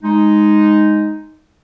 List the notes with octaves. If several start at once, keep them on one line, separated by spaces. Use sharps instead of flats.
G#3 D#4